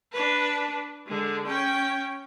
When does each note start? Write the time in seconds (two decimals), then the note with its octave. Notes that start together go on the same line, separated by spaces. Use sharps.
0.13 D4 B4
1.07 D3 G#3
1.47 C#4 G5